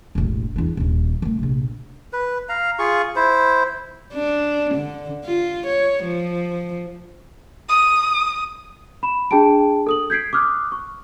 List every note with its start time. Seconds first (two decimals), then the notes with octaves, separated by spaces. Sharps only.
0.15 E1 A1
0.56 E2 D4
0.77 D#1 D#3
1.22 D#3 A3
1.39 A#1 C3
2.13 B4
2.49 F5 A#5
2.79 F4 G#4 C#6
3.16 E4 C5
4.13 D4
4.74 D3
5.25 F4
5.67 C#5
6.04 F3
7.69 D#6
9.03 B5 E7
9.31 D4 G#4 G5 A5 D7
9.87 A4 D#6 F#7
10.10 G6 G#6 B6 C7 D7
10.33 D6 D#6 F6 F#6
10.72 C#6